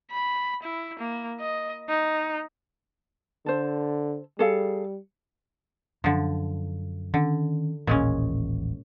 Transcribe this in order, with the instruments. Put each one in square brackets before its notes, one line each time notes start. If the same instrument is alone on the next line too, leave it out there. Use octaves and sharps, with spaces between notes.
[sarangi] B5
E4
A#3
D#5
D#4
[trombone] D3 [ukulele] A4 C5
[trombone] G3 [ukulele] G#4 A4 F5
[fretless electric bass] F#2 [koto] D3 F3
[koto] D3 [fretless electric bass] D#3 C#4
[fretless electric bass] D#1 A1 [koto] A#2 G#3 C#4